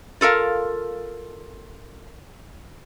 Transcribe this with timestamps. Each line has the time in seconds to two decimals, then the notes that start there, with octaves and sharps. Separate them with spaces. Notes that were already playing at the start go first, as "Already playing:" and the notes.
0.21 F4 A4 A#4 F5